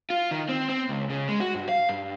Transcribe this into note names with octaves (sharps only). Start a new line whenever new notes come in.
F4
D#3
C4
C4
C#2
C#3
G#3
F#4
G2
F5
G2